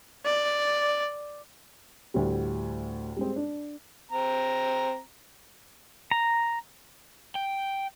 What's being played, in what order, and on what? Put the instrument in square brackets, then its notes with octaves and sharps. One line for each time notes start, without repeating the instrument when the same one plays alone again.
[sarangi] D5
[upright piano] D2 A2 G3
G3 G#3 C4
D4
[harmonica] C4 A#5
[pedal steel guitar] A#5
[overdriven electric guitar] G5